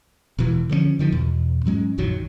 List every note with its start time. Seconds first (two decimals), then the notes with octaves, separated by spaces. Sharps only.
0.39 E1 B2 E3
0.69 D3 F3 A3 C#4
0.99 D3 D#3 F3
1.12 E2 B2
1.66 G#2 F#3 G#3 C#4
1.98 A#1 F#2 D#3 F#3